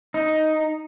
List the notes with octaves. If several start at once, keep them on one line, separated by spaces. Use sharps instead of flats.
D#4